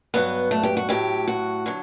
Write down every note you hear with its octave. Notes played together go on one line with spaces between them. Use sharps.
G2 F#3 B3
A3
G4
F#4
A2 F#3 G4
F#4
D3 F#3